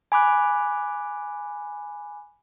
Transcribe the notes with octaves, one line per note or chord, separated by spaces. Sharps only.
G#5 B5 D6 F#6